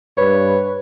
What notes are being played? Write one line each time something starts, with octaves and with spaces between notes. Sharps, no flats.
G2 B4 C#5